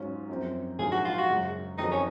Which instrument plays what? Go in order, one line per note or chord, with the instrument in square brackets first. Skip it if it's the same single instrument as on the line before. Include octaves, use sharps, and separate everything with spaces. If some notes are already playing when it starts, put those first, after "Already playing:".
Already playing: [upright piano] G#2 F#3 C#4 F4
F#2 F3 C4
[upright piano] A#1 G#2 F#3 A#3 F4 [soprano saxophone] G#4
[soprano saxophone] F#4
F4
F#4
[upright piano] F#2 C#3 G#3
[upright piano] F#1 F2 D#3 F#3 [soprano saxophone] D#4
[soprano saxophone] C#4